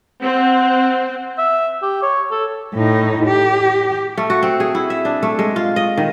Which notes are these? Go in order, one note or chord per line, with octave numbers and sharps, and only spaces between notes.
C4 F#5
E5
G4
C#5
A4
A2 D#4
G4
A3
F#4
C4
G#4
E4
E5
D4
A3
G#3
F4
D#5
D#3